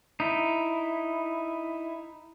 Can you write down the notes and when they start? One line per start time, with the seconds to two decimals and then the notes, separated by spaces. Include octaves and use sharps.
0.20 D#4 E4